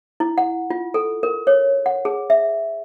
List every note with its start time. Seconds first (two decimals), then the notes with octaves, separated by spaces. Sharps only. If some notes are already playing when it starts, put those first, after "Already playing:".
0.20 E4
0.38 F#5
0.70 F4
0.94 A4
1.23 A#4
1.47 C#5
1.86 F#5
2.05 G#4
2.30 E5